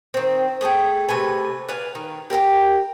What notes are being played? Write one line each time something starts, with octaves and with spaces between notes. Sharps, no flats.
D#3 C4
A3 G#4 A4 G5
C3 A3 B4 G#5
B4 D5 F5 G#5
D#3
G4 A#4 F5 G5